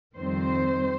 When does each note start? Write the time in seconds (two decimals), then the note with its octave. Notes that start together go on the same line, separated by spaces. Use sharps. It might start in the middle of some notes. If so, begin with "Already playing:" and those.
0.18 F2 D#3 G3 C4 C5